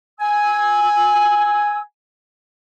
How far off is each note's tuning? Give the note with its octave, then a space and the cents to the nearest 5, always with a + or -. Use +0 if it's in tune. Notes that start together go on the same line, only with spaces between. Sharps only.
G#5 +0 E6 -25